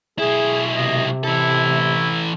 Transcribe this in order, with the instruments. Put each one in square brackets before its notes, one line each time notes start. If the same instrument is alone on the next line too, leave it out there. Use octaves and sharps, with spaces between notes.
[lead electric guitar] B1 E4 [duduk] G#4
[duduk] C3 [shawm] D#5
[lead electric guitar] E3 A4 [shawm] E4